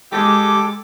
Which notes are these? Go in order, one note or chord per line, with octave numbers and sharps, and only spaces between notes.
G#3 G4 A4 D6